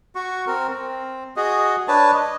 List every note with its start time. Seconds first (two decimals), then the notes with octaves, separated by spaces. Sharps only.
0.15 F#4 C#6
0.47 C4 A#4
0.70 C4
1.36 F#4 G#4 D#5
1.88 D4 B4 C#5 A5
2.14 D#5